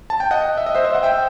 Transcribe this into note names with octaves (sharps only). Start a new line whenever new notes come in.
A5
G5
D#5 F#5
E5
D#5
C5 E5
C5 E5
F#5
E5 G5